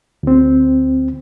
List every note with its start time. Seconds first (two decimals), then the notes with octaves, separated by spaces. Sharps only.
0.23 D2 C4